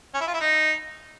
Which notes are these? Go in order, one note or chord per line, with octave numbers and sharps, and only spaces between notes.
C#4
E4
F4
E4
D#4